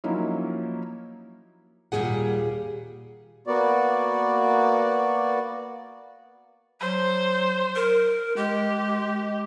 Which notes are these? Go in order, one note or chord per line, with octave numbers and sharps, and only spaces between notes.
F3 F#3 A#3 C#4 D#4 E4
D#2 A#2 G3 G#3 G#4 F#5
A#3 B3 F#4 D5
F#3 C5
A#4
G#3 G4